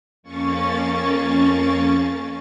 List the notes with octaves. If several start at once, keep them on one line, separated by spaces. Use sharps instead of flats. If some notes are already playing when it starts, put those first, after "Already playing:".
F2 A#3 C#4 C#6 A6